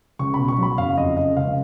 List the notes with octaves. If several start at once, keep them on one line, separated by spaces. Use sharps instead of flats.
C#2 C#6
B2 B5
C#6
F#3 B5
F#1 F5
F2 D#5
C#3 D#5
C#2 F5